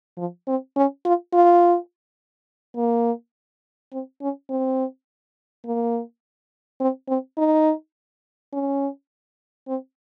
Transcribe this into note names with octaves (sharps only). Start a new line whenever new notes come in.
F3
C4
C#4
F4
F4
A#3
C4
C#4
C4
A#3
C4
C4
D#4
C#4
C4